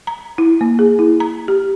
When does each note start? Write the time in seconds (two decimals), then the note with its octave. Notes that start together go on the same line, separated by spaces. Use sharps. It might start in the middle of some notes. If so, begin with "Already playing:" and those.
0.07 A#5
0.38 E4
0.61 A#3
0.79 G#4
0.99 E4
1.20 A#5
1.48 G4